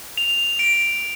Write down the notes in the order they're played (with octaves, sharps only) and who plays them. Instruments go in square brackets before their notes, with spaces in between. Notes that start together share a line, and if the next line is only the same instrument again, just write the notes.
[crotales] F7
D7